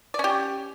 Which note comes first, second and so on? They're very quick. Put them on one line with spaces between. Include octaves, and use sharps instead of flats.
D5 C#4 G4